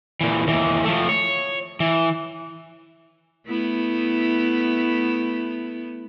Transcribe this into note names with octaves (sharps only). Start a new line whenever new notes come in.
A#2 E3
D#2 E3
F3 A3
C#5
E3
A3 B3 E4